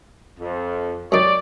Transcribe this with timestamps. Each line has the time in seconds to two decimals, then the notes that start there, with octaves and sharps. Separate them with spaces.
0.39 F2
1.12 F#2 D#4 G4 C#5 D5